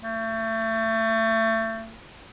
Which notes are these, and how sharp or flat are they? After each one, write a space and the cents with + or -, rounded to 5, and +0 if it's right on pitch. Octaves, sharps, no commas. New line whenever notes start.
A3 +30